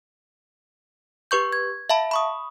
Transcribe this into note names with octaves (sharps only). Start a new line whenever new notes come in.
G4 B4 C#6 G6
G#6
E5 F5 A5 B5
B5 C#6 D#6